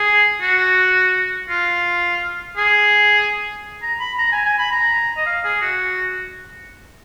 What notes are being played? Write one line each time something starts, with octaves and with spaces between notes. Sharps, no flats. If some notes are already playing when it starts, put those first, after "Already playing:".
Already playing: G#4
F#4
F4
G#4
A#5
B5
A#5
G#5
G#5
B5
A#5
D#5
F5
G#4
F#4